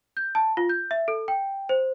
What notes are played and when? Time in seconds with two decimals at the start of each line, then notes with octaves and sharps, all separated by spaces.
0.17 G6
0.35 A5
0.57 F4
0.69 G6
0.91 E5
1.08 A4
1.28 G5
1.69 C5